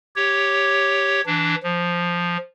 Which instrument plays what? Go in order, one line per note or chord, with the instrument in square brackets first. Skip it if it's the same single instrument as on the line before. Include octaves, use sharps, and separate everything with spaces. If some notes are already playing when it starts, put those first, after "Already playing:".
[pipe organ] G4 C#5
E3 D4
F3